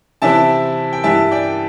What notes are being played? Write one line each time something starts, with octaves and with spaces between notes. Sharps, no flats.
C3 E3 C4 E4 E5 A5
G5
G2 E3 G3 E5 A5
D5 G5